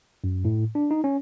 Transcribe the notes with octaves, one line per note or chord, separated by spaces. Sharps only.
F#2
A2
D4
D#4
C#4